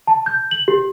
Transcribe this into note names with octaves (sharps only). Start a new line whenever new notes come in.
A5
G6
F#7
G4